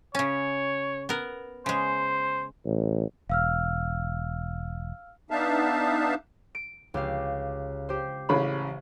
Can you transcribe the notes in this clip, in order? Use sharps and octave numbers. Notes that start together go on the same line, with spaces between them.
C#3 C#4 C#5
B3 A#4
C#3 G#3 C5
A1
E1 F5 E6 F6
B3 D4 D#4 E5 F5 A5
D7
C#2 G4 F5
G4 C5
A1 C#3 B5